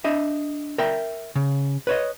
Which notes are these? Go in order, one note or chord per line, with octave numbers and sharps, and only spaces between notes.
D4 D#5 E5
A#4 E5 G5
C#3
B4 C#5 D#5